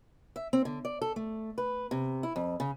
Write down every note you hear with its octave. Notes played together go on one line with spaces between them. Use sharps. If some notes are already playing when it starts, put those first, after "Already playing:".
E5
C4
D3
D5
A4
A3
B4
C3
E4
F2
C#3